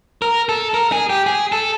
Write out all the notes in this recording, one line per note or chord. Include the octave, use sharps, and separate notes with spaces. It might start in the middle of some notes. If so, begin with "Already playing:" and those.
A#4
A4
A#4
G#4
G4
G#4
A4